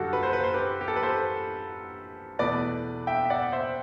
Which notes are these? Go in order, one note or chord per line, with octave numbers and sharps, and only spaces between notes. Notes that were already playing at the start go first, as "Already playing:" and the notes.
Already playing: F#2 D3 G3 F#4 G4 A4
B4
C5
B4
C5
G4 B4
G4
A4
B4
A4 C5
E2 B2 A3 B4 D5
E5 G5
E5
D5 F#5
C5 E5